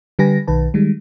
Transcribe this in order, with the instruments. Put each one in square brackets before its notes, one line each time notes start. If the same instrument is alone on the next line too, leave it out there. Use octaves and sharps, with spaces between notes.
[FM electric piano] D3 G3 G4 B4 G#5 A#6
B1 D#3 B4 A5
D#3 G3 G#3